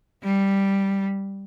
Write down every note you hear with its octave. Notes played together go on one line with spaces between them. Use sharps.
G3